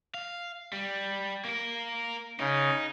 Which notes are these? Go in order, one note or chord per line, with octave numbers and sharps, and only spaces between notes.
F5
G3
A#3 A#4
C#3 D#4